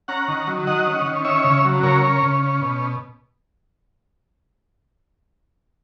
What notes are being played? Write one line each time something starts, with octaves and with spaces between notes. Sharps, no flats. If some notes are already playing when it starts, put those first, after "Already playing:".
C#4 F#5 A#5
D#3
F#3
D#3 D#5 F#5
C#4
D#3
C#4 C#5 E5
C#3
F#3
C#3 A#4 C#5
C#4
C#3
C#4
B2